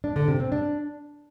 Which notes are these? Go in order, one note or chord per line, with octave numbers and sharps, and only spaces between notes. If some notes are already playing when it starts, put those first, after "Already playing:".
D4
D3
C3
C4
D4